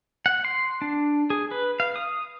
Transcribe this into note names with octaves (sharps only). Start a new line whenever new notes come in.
F#5
C6
D4
G#4
B4
F5
D#6